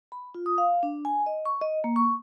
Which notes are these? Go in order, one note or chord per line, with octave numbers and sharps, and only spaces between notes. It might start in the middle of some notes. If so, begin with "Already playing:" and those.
B5
F4
D#6
F5
D4
G#5
D#5
C#6
D#5
A#3
C#6